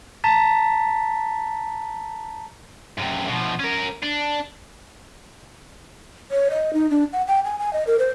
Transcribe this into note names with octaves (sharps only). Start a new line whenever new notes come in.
A5 A#5 A6 B6
F#2 C3
B2 F3
C#4 A#4
D4
C#5
D#5
D#4
D4
F#5
G5
G#5
G#5
D#5
A#4
C5